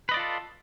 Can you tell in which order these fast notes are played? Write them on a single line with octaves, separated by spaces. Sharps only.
B4 D#5 D5 F4 A4